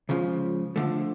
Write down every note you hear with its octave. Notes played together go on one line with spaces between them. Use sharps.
C#2 C#3 F3
D3 F3 A3